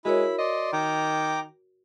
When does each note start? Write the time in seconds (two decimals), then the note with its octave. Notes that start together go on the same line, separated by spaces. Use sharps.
0.05 G#3 E4 F#4 A#4 C#5 B5
0.39 D5 D#5 C6
0.73 D#3 G5 A#5 D6